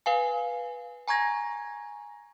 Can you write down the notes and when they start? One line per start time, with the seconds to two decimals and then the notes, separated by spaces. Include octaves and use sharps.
0.06 B4 F5 G#5
1.08 G#5 A#5 C#6 G#6 A#6